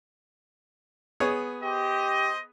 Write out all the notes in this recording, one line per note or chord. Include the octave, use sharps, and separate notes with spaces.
B3 G#4 C#5
G4 C5 D#5